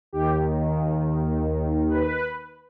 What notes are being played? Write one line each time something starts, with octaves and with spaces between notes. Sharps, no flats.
D#2 D#3 G4
B4